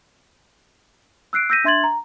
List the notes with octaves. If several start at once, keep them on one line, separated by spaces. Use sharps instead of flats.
E6 F#6 C7 D7
E6 G6 A#6 B6 D#7
D4 E5 C6 G#6 A6 F#7
A#5